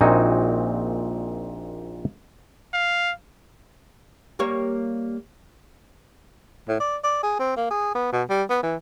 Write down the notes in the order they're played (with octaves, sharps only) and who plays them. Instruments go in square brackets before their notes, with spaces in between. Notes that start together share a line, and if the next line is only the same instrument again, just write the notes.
[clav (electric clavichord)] A#1 A#2 C4 D#4 F#4 G#5
[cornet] F5
[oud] G3 A#3 C#5
[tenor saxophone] A2
D5
D5
G#4
C4
A#3
G#4
B3
B2
G3
B3
E3